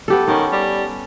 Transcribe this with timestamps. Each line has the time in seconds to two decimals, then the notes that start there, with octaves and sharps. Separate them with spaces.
0.08 B3 G4 A4
0.28 D#3 B3 C#4
0.52 G3